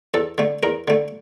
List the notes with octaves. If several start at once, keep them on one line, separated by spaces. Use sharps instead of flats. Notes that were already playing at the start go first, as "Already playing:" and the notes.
E2 A4
D3 A3
E2 A#4
D3 A3